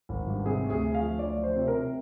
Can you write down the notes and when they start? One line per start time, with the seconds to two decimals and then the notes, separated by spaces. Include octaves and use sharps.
0.09 G#1
0.27 G2
0.46 C3 G#4
0.64 D2
0.70 G#4
0.82 D2
0.94 F5
1.01 F3
1.19 D2 D5
1.37 F3
1.44 C5
1.56 C3
1.67 A#4
1.74 C3